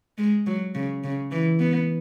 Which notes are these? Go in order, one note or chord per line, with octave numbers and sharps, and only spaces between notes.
G#3
F#3
C#3
C#3
E3
B3